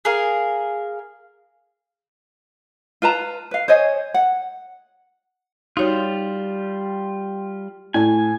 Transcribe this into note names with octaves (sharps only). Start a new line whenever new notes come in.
G#4 A#4 F5
F4 B4 A5 A#5
B4 F5
C5 C#5 D#5 G#5
F#5
G3 D#4 F4 F#4 C#5
A2 D5 G#5 A5